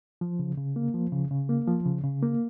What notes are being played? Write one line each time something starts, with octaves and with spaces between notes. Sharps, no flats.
F3
C#3
C#3
A#3
F3
C#3
C#3
A#3
F3
C#3
C#3
A#3